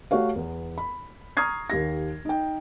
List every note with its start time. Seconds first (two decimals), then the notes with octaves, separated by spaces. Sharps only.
0.11 A3 F#4 G4 C#5 F5
0.36 E2 B3
0.78 B5
1.37 A#5 C#6 D#6 F6 G#6 C7
1.70 D#2 G4 A#6
2.25 D#4 G5